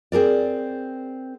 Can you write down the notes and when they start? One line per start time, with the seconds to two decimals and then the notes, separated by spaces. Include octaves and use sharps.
0.12 C4 G#4 A#4 D5